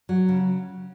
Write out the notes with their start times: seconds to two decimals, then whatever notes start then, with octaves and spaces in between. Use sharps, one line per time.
0.09 F#3
0.28 C#3